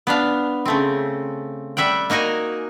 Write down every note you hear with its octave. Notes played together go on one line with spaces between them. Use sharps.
B3 D4 F5
C#3 A3 C4
G3 E5 F#5 G5
A#3 D#4 F#4 A#4 G#5